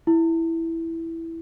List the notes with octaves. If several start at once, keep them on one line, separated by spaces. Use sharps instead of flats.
E4